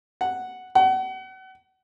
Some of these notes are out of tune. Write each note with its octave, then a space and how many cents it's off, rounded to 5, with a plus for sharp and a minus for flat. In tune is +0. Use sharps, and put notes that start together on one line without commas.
F#5 +0
F#5 +35